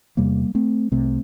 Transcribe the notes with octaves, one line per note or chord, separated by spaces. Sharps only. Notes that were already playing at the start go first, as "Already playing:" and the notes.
E2 C3 G3 A#3
A3 C4
C2 C3 A3 C4